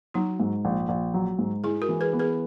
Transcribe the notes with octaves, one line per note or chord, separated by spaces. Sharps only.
F#3 D#4 F#4
G#2
A#1
A#1
F#3
G#2
G#3 E4 G#4
F#4 A#4
E3
G#4 B4
B3
G#4 B4